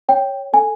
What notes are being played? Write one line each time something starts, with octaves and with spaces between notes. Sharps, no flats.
C#5 G5
A4 G#5